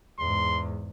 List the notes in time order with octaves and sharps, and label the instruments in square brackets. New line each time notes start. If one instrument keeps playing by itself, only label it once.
[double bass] E2 G#2 [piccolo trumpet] C6